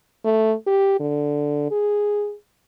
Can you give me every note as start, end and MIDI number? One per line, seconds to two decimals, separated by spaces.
0.25 0.54 57
0.67 0.97 67
1.00 1.70 50
1.71 2.34 68